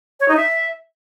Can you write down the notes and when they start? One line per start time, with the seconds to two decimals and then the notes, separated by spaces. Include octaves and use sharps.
0.20 C#5
0.28 D#4
0.37 E5